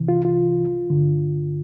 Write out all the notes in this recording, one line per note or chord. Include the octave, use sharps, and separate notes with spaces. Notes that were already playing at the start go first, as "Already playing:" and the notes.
Already playing: C2 C3 E3
F4
F4
G2 D3